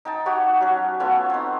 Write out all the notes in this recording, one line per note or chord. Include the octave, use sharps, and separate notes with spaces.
D#4 G5 A5
F#4 G4 C#5 F#5
F#3 C#4
A3 B3 C#4 F4
C4 D#4